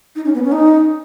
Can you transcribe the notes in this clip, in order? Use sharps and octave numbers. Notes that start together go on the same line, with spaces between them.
D#4
C#4
B3
C#4
D#4